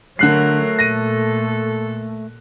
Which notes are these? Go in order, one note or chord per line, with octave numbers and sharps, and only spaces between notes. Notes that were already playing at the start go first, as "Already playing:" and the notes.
D3 F#3 A3 A#4 F#6 C7
A#2 A4 A#6 D#7